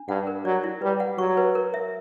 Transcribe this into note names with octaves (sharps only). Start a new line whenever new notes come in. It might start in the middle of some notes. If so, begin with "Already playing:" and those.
Already playing: D4
G2 F#5
A#4
F#3 D5
E4
G3 B4
F#5
F#3 C#6
B4
A#4
E5